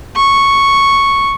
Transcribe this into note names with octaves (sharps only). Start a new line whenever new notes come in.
C#6